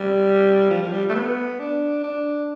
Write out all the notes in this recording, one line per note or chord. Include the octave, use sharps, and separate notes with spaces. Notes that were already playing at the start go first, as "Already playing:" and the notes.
Already playing: G3
F3
F3
G3
A3
B3
D4
D4